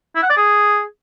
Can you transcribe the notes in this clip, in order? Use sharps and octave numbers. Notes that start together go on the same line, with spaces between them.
E4
F#5
D5
G#4